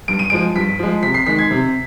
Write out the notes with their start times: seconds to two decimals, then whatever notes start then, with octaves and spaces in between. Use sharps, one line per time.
0.08 G2 D7
0.19 D#7
0.30 F3 G#3 D7
0.55 G2 B6
0.79 F3 G#3
1.03 C3 B6
1.14 C7
1.26 D#3 G#3 B6
1.39 G#6
1.51 C3